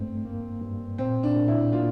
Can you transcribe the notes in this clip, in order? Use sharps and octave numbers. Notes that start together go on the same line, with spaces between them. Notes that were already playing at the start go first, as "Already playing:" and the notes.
Already playing: G2 A3 C4
A#3
G2
A#2 C4
D4
A#2
E4
A#3 F4